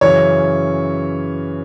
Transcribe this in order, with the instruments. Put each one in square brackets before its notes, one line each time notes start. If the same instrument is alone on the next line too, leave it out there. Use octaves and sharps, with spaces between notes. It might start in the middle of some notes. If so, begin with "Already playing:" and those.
[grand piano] F#2 C#3 E3 C#5